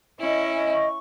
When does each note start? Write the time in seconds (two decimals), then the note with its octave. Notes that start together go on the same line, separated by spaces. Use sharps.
0.18 C#4 E4 D#5
0.37 G#5
0.55 D#5
0.73 C#6